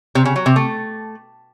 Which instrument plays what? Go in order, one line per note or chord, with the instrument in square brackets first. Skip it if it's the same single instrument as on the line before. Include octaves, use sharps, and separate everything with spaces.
[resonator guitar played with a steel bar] C3
C#3
F#3
C3
A3